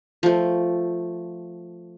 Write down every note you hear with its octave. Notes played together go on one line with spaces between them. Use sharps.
F3 A3